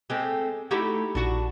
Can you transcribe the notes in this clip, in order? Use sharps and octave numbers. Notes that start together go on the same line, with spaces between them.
G#3 A3 C4 G4
A3 D#4 E4 F#4 G4
A#1 D4 F#4